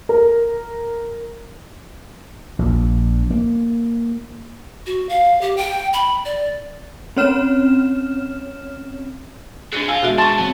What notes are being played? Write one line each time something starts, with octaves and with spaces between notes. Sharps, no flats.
A#4
A#1
A#3
F#4
F5
G4
G5
B5
D5
C4 C#4 C#5 F6 E7
G#3 C4 D4 G#4 A6 C#7 D#7
F3 F4 F5 G#5 E6
B2 G#3 F#4 G#4 E5
B3 D4 A5 C6 C#6
F#3 B3 C4